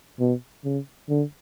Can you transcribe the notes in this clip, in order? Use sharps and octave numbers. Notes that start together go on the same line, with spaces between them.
B2
C#3
D3